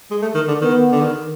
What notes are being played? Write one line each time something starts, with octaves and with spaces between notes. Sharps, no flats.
G#3
A3
D#3
D3
D#3 B3
D3
D#3